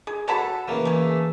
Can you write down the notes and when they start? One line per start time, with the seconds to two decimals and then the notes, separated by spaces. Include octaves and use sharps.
0.07 G#4
0.28 F#4 A4 C#5 A5 B5
0.68 C#3 E3 A#3
0.85 A3 G#4